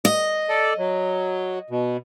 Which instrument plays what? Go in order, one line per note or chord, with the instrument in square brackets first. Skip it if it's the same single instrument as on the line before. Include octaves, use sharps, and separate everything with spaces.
[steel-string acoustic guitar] D#5
[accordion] A4 D5
F#3
B2